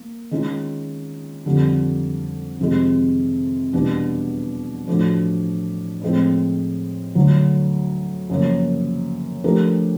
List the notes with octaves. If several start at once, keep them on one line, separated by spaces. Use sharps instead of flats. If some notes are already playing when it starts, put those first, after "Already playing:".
Already playing: A#3
D#3 G#3 C#4 F4
F2 D3 G3
F2 C3 D#3 G#3
E2 B2 G3 B3 D4
A2 F3 A3 D4 F#4
A2 F3 G#3 C4
D2 D3 F#3
F#2 C#3 F3 A#3
F3 A3 D4 G4 A#4